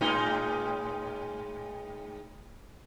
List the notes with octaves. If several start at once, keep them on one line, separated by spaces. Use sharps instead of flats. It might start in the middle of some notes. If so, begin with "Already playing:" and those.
A2 G#3 D#4